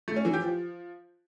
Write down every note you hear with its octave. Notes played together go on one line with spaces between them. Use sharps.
A3
C#4
E3
G4
F3